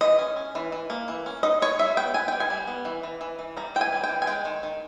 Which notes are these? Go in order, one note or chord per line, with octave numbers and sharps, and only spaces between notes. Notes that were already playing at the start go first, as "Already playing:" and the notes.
E3 D#5
C#4
C#4
E3
E3
A#3
E3
C#4
D#4 D#5
D#4 C#5
G3 E5
B3 G5
B3 G#5
G3 G5
G#5
G3
B3
E3
E3
E3
E3
G3 A#5
E3 G5
G#5
G3
G5
E3
G#5
G#3 G5
D#3
D#3